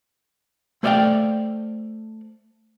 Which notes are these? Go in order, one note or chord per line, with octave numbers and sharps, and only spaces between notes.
A3 C5 D5 E5 F5 G5